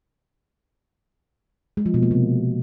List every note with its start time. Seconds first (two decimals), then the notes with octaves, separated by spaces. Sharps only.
1.77 G#3
1.86 F3
1.94 B2
2.02 A#3
2.11 C3